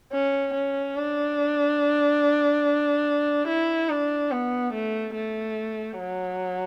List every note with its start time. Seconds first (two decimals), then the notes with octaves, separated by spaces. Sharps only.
0.13 C#4
0.54 C#4
0.97 D4
3.48 E4
3.89 D4
4.31 B3
4.74 A3
5.15 A3
5.99 F#3